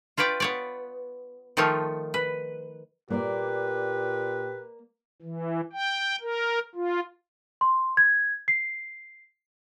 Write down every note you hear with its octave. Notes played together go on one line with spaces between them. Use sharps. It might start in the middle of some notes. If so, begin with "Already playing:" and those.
F4 B4 C#5 D5 G5
B3 C#5 D5
D#3 F3 A3 D#4 F4 C#5
B4
A#2 A#3 G4 B4 D5
E3
G5
A#4
F4
C6
G#6
C7